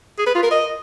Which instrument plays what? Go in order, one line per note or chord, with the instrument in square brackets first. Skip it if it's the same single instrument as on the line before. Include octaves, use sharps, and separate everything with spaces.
[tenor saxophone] G#4
B4
F4
A#4
D#5